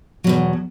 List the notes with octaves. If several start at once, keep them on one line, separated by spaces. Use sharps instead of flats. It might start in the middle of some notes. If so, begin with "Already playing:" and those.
E2 B2 F#3